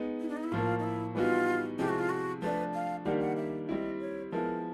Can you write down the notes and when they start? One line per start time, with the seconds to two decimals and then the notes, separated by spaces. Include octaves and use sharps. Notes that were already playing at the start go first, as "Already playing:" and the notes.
Already playing: G#3 B3 D#4
0.20 E4
0.28 D4
0.37 D#4
0.44 E4
0.52 A2 F3 A#3 F4
0.79 D#4
0.83 E4
1.15 E3 G3 B3 D#4 F4 F#4
1.79 C3 F3 G#3 C4 E4 G4
1.89 F#4
1.99 F4
2.09 F#4
2.41 F3 A3 D4 B4
2.74 F5
3.05 D#3 G3 A#3 D4 G4 F#5
3.21 F#5
3.37 E5
3.68 G3 C4 E4 D#5
4.00 C#5
4.32 F3 G#3 B3 E4 A#4